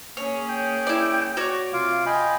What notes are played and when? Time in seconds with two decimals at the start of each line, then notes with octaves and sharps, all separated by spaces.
0.17 A#3 C#4 G#4 C#5
0.50 G5
0.87 E4 D5
1.37 F#4 C#5 D5
1.73 C3 F4 F5 D6
2.06 F4 D#5 G5 G#5 B5